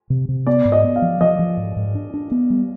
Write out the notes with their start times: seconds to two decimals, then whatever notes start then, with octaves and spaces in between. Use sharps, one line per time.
0.10 C3
0.29 C3
0.47 B3 D5
0.65 G#2
0.72 D#5
0.84 B3
0.96 F5
1.02 F3
1.21 F3 D#5
1.39 F3
1.57 G#2
1.76 G#2
1.95 D4
2.14 D4
2.31 B3
2.50 G3